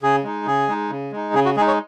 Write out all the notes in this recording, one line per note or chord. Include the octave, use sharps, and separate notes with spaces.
C#3 G#4
G#3 D#4
C#3 G#4
G#3 D#4
C#3
G#3 D#4
C#3 G#4
F#4
G#3 D#4 G#4
C#5